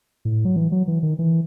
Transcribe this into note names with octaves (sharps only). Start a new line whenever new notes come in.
A2
F#3
E3
F#3
E3
D#3
E3